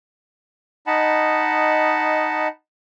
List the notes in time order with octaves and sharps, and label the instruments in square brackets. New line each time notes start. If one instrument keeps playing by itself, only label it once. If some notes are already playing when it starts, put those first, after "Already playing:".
[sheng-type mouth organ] D#4 D#5 F#5 A5 B5